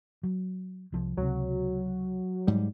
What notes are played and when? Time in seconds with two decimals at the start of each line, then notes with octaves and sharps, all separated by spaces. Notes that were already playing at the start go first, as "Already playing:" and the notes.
0.23 F#3
0.92 C2 F3
1.17 C#2 C3 F#3
2.47 G#2 G3